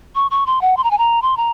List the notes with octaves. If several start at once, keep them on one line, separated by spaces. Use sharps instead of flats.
C#6
C#6
C6
F#5
C6
A#5
G#5
A#5
C6
A#5